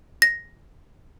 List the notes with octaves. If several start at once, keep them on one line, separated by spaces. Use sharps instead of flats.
A#6